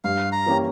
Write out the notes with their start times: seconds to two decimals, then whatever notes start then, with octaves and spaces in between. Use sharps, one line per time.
0.04 G2 F5
0.32 A#5
0.46 E3 A#3 C#4 G4